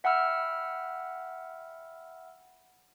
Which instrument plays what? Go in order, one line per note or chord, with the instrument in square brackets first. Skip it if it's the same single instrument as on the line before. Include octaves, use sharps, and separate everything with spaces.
[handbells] E5 F#5 G5 B5 E6 F6